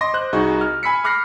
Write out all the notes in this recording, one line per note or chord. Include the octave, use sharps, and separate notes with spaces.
D#5 C6 D6 A#6
C5 F#6
C2 D#4 F#4 G#4 C#6
F6
G#5 B5 E6 B6 C#7
B5 D6 F6 F#6 A#6 C7